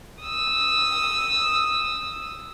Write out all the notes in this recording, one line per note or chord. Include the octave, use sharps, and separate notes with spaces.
D#6 E6